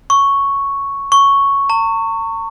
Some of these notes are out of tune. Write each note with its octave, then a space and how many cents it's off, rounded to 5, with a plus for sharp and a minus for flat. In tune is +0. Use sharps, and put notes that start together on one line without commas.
C#6 +0
C#6 +0
A#5 -45